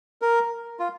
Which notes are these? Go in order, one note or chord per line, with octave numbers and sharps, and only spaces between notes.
A#4
F4